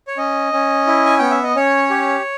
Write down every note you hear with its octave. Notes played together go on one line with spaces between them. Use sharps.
C#5
C#4 D#5
C#4
E4
G#5
B3 G5
E5
D#5
C#4 C#5
G4